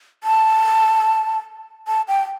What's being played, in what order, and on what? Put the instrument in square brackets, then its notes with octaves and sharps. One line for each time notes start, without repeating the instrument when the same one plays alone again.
[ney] A5
A5
G5